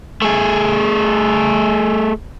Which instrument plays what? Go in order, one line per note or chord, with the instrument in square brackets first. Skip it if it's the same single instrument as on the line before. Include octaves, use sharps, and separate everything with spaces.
[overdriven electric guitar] A3 G#4